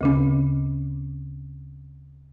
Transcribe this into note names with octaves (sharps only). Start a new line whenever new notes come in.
D2 C#3 C#4